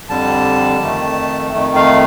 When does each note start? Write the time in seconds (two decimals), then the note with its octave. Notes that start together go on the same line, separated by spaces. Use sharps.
0.09 F2 D3 G3 A5
0.80 F2 D#3 A3
1.52 F2 D#3 A3
1.76 F5